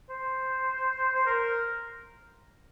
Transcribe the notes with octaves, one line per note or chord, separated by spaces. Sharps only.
C5
C5
A#4